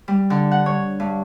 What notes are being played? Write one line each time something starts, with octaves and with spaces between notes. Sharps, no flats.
G3
D3
F#5
C#5
G2